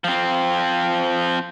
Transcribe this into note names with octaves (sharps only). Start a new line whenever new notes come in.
F3 C4